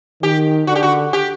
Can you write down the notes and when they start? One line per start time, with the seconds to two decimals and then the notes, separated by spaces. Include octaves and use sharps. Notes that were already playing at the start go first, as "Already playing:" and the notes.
0.22 D#3 G4
0.67 D3 F#4
0.75 G4
0.83 F#4
1.13 G4